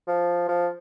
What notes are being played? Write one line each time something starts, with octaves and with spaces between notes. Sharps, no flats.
F3
F3